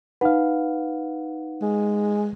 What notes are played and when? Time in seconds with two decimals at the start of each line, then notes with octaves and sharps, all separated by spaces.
0.21 D#4 B4 F5 F#5
1.62 G#3